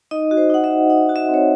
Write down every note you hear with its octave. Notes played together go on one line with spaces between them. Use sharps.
D#4 D#5
F#4
C5
D#4 F#5
E5
F#4
D#4 F#5
F#4
E5
C4
C#5